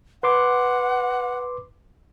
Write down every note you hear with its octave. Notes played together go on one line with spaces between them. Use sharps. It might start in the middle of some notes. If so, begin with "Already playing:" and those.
B4 F#5 C6 D6